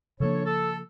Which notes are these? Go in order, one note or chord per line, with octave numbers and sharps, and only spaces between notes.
C#3 F3 A#3 D4 A4 C#5
A4